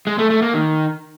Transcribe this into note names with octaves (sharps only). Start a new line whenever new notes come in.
G#3
A3
A3
A#3
D#3